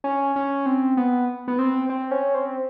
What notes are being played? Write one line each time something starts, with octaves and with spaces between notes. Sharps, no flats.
C#4
C#4
C4
B3
B3
C4
C4
C#4
C4